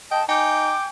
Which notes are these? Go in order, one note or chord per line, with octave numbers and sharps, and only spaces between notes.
D#5 G5 A5
D#4 G5 G#5 D6